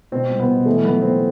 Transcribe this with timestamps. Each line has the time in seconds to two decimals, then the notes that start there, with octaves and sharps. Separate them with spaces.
0.12 B2 C4
0.30 C2
0.40 B3
0.48 B2
0.66 E3 A3
0.84 F#2 B3
1.02 E3 C4